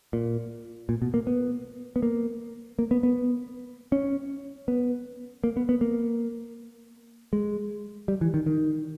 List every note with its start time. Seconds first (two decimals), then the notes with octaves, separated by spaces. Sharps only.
0.13 A#2
0.89 A#2
1.02 B2
1.14 A#3
1.27 B3
1.96 B3
2.02 A#3
2.79 A#3
2.91 B3
3.03 B3
3.92 C#4
4.68 B3
5.44 A#3
5.57 B3
5.69 B3
5.81 A#3
7.33 G#3
8.08 G3
8.21 E3
8.34 D#3
8.46 D#3